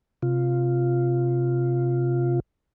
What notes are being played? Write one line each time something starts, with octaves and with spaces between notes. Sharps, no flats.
C3 F4